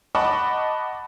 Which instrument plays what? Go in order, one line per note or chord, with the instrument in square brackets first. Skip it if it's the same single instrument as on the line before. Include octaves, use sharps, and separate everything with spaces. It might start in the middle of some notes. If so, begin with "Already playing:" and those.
[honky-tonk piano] D#5 F#5 A5 B5 C#6 D6